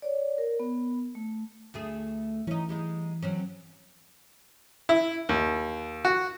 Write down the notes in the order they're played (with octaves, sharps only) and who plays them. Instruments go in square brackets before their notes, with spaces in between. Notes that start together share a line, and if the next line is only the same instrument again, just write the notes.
[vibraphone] C#5 D5
A#4
B3
A3
[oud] D2 A3 G#4
[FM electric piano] E3 [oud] C#4 D#4
[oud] G3 G#3 D#4
F#3 C4 C#4
[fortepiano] E4
D#2
F#4